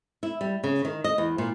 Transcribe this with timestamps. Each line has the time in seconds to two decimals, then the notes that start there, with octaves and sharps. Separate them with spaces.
0.23 E4
0.41 G3
0.64 C#3
0.85 D#3
1.04 D#5
1.18 E2
1.38 A#2